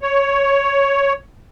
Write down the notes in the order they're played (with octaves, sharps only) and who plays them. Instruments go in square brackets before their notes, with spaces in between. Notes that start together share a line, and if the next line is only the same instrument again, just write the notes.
[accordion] C#5